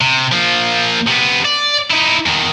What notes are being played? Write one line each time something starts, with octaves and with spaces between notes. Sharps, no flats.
C3
F3 A#3
C3 B3
D5
D#4 E4
E2 D#3